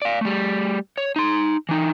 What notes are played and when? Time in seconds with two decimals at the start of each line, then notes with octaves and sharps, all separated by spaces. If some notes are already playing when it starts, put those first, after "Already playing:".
0.02 D5 F5
0.21 G3 A3
0.98 C#5
1.16 D#4 C6
1.69 E3 D#4